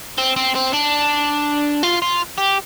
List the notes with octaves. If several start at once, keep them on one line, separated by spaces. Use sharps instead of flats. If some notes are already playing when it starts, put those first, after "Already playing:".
C4
C4
C4
D4
F4
F4
G4